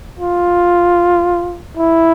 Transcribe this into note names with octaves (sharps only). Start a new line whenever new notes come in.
F4
E4